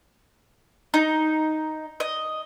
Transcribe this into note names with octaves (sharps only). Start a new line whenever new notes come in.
D#4
D#5